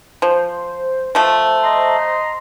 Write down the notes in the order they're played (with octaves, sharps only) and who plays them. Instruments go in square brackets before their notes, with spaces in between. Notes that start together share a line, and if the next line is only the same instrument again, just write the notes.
[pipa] F3 [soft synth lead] C5
[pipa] F3 A3
[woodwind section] D#5 A#5 C6